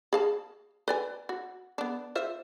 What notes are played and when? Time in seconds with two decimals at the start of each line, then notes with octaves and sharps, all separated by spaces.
0.13 G#4 F5 A5
0.88 B4 D5 G#5
1.29 F#4
1.78 B3 D4
2.15 F4 C5 E5